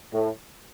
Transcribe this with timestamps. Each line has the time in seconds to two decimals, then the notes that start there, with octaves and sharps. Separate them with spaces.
0.12 A2